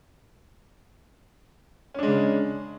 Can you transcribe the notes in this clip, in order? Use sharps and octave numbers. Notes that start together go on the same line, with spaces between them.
C#3 G#3 C#4 D4